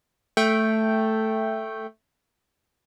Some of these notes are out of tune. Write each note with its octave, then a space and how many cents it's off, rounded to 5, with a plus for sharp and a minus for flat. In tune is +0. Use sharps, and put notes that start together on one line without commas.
A3 +0 G5 -5